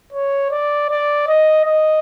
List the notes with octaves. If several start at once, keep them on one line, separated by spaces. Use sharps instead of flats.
C#5
D5
D5
D#5
D#5